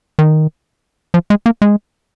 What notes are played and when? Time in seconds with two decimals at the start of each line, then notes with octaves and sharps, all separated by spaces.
0.19 D#3
1.14 F3
1.30 G#3
1.46 A#3
1.62 G#3